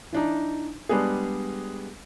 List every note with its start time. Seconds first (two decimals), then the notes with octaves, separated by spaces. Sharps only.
0.13 E3 D4 D#4
0.89 G3 G#3 B3 D4 G#4